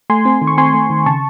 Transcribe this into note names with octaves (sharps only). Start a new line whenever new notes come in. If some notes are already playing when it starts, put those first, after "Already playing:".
A3 G#5 C6
C4
D#3
C#6
C4 G#5 C6
A3
D#3
C#3 A5 C#6